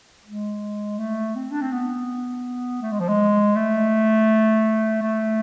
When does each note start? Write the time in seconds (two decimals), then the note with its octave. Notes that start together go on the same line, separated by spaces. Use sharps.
0.25 G#3
0.98 A3
1.36 C4
1.52 D4
1.62 C4
1.72 B3
2.82 A3
2.92 G#3
3.00 F3
3.08 G#3
3.56 A3
5.02 A3